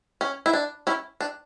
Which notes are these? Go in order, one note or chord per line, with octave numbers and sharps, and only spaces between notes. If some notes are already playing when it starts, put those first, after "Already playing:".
C#4
E4
D4
C#4 E4
D4